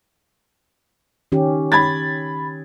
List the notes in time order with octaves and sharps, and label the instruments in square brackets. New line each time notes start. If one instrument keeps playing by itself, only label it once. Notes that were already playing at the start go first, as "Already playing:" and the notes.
[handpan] D#3 C#4 G4
[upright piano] B5 G#6 A6